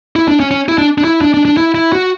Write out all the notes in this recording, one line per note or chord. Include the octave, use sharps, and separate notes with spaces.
E4
D4
C#4
C#4
E4
D4
D4
E4
D4
D4
D4
E4
E4
F#4